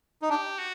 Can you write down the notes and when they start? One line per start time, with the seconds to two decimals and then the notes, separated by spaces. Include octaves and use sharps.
0.22 D#4
0.30 D4 G4
0.59 F#4